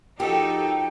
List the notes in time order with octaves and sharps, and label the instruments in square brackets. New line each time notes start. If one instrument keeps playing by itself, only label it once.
[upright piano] F3 F#4 A#4 [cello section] D#4 A4 [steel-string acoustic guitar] G4 [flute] G5